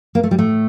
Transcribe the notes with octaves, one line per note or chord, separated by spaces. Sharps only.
A#3
A3
G3
A2 A3